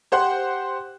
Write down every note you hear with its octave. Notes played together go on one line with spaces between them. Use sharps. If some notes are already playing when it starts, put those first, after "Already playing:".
G4 C5 F#5 C6 F#6